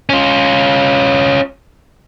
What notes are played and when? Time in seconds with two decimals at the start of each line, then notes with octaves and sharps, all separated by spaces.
0.09 C#4 F4